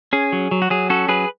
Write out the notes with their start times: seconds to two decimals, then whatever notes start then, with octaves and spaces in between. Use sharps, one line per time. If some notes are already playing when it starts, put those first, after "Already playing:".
0.13 C#4 G#4
0.33 F#3
0.51 F#3
0.62 F#4
0.70 F#3 G#4
0.90 C#4 F#4 A4
1.09 F#3 G#4 B4